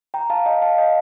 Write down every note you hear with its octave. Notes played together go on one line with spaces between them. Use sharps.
G5 A#5
F5 A5
D#5 G5
F5 A5
D#5 G5